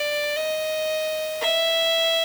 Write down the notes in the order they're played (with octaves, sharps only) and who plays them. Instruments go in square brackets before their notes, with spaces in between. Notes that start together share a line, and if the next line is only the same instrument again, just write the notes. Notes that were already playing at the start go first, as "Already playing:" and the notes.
Already playing: [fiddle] D5
D#5
E5